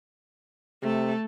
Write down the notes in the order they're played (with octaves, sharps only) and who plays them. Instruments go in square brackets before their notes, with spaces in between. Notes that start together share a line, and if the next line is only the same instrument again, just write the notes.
[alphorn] C3 [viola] A3 A4